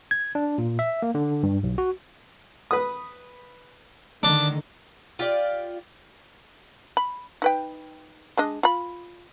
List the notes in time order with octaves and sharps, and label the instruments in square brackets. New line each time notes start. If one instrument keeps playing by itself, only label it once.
[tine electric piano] G#6
D4
A#2
E5
A#3
D3
G2
B1
F#4
[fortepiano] B4 D#6
[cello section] D3 D#3 [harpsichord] D4
[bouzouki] F4 G4 D5
[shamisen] B5
D#4 B4 G5
G#3 D4 D#5
F4 B5